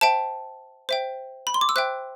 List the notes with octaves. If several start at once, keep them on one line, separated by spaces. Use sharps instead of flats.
C5 E5 G5 A5
C5 E5 G5
B5
C6
D6
E6
C5 E5 G5 F#6